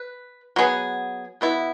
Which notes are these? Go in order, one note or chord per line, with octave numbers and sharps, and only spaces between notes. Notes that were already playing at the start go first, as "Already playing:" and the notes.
Already playing: B4
F#3 B3 G#4
B2 B3 E4